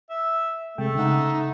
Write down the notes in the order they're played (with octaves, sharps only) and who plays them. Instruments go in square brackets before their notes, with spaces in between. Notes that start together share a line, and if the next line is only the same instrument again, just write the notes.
[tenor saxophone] E5
[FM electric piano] C3 G#3 G5 [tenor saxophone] A3
[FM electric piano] C#3 F#5 [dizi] D#4